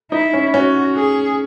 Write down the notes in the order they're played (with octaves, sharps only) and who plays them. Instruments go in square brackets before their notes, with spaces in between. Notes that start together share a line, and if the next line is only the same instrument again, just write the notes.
[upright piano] D#4 [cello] E4
[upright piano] C#4
[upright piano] C#4 [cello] F#4
[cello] G#4